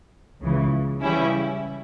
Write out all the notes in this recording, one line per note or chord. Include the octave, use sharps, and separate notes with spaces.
C#2 C#3 E3
C#3 E3 G3 C#4 E4